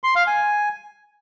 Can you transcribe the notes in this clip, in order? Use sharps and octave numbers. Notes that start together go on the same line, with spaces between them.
C6
F5
G#5